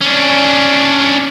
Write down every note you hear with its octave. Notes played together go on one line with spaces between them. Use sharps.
C#4 D4